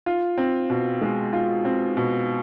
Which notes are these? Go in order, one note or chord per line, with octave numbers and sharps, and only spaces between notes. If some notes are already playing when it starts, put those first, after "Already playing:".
F4
C4
B2
G#3
F4
C4
B2